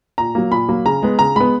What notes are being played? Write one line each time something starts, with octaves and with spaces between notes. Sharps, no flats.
A#2 A#5
F#3 A#3
A#2 B5
F#3 A#3
C#3 A#5
G#3 B3
C#3 A#5
G#3 B3 B5